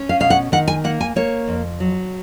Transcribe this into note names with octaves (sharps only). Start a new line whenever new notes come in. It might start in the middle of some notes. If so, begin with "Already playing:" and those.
Already playing: C#4
F5
B2 F5
F#5
D#3 F#5
G#5
A#3 F#5
G#5
A#3 C#5
F2
F#3